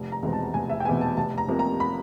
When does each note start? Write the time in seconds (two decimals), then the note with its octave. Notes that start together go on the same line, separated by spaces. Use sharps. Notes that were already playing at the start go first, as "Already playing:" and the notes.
Already playing: F1
0.12 A#5
0.23 E2 B2 G#3 C4
0.33 A5
0.54 F1 G#5
0.70 E5
0.80 G5
0.85 E2 B2 G#3 C4 G#5
1.01 A5
1.17 F1 A5
1.38 A#5
1.48 F2 C3 F3 A#3
1.59 A#5
1.80 B5